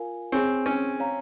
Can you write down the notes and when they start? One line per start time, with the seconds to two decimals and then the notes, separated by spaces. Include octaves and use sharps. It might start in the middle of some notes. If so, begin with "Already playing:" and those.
Already playing: F4 A#4 F5 G#5
0.32 C4 G#4 C#5 G#5 C#6
0.66 C#4
1.00 C#5 F5 A#5